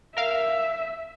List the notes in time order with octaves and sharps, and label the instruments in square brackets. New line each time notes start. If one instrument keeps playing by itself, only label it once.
[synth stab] A#4 F5 [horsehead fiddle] E5